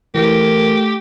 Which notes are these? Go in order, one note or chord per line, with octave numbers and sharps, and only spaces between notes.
E3 A3 G4 A#4